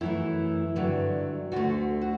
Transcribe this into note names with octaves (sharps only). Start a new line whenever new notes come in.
F#2 E3 A3 E4
G2 D3 F#3
D2 D3 A3 F#4
F#4